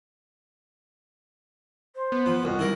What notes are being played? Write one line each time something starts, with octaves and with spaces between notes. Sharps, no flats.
C5
B3
F3
C2 F2 F#4
D#3 E3 G3 E4 A#4